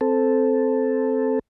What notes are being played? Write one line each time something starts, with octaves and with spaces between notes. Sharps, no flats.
C4 A4